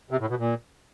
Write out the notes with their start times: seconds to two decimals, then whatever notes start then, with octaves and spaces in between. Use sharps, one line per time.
0.11 C3
0.20 A2
0.29 B2
0.39 A#2